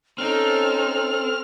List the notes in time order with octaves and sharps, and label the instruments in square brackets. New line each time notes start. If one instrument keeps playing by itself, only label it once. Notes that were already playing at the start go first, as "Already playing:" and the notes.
[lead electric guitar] C4 [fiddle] C#4 D#4 [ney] A4 [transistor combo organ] F6